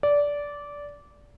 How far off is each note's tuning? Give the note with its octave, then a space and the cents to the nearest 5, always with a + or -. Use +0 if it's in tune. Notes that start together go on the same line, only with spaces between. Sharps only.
D5 -15